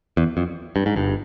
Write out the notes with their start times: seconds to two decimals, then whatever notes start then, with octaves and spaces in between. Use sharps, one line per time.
0.17 E2
0.37 F2
0.76 G2
0.86 G#2
0.96 G1 G2